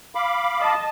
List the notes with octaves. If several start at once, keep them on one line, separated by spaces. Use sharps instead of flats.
F5 B5 D6
D#5 A5